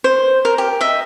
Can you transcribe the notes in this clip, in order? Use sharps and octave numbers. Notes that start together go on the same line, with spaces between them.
C5
A#4
G4
D#5 E5